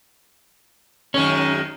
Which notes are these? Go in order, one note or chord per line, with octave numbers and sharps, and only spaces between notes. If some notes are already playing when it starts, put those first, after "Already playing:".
F#2 D#3 G#3 C#4